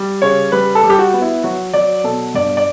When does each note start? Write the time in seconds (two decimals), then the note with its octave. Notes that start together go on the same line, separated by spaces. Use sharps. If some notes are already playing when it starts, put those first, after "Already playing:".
Already playing: G3
0.22 C#3 C#5
0.52 G3 B4
0.75 A4
0.83 G3
0.90 G4
0.99 F#4
1.13 B3
1.22 E4
1.44 F#3 F#4
1.73 F#3 D5
2.04 B2 A4
2.34 G2 D5
2.57 D5